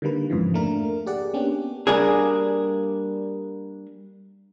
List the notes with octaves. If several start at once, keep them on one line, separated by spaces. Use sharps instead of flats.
D3 D#3 G3 A#3 B4
F2 G#2 C#3 E3 F3
A3 A#3 D4 A#4
G4 G#4 D5 F#5
A#3 B3 C#4 D4 G4
G3 A#3 D4 G#4